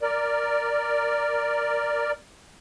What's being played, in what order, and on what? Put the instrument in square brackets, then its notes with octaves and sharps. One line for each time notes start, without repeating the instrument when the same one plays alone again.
[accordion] A#4 D5